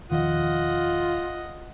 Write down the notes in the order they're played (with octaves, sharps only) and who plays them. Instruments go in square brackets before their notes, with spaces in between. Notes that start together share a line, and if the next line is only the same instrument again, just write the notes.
[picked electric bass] E1 D#3 F3 [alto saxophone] F4 [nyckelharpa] D#5 F#5